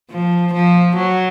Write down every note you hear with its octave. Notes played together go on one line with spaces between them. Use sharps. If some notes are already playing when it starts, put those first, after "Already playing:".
F3
F3
F#3